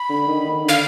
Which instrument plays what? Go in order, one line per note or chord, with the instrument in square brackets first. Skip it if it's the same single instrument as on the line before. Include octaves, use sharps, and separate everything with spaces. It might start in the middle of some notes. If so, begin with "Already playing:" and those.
Already playing: [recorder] B5
[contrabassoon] D3
D#3
D#3
D3
[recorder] F5